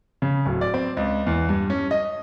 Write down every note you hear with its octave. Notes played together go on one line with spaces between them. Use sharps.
C#3
D1
D5
C4
C#2
E2
G2
C#4
D#5